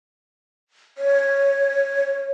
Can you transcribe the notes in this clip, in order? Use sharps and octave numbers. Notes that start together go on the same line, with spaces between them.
C#5